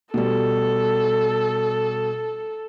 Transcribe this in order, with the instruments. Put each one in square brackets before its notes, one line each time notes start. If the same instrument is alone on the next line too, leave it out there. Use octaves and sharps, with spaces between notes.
[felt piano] B2 G3 [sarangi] A4